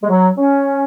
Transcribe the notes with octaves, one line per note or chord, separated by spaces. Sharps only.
G#3
F#3
C#4